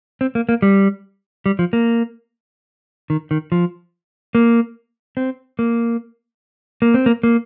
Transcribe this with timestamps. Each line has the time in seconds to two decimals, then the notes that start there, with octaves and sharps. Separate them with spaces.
0.21 C4
0.35 A#3
0.49 A#3
0.62 G3
1.46 G3
1.59 F3
1.73 A#3
3.10 D#3
3.31 D#3
3.52 F3
4.35 A#3
5.17 C4
5.59 A#3
6.82 A#3
6.94 C4
7.06 A#3
7.23 A#3